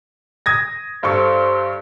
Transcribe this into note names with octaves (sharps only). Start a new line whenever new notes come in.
D#6 G#6 A#6
G2 A4 C5 C#6